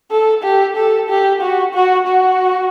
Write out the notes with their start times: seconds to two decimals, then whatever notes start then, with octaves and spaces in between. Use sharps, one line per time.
0.11 A4
0.43 G4
0.76 A4
1.09 G4
1.41 F#4
1.74 F#4
2.07 F#4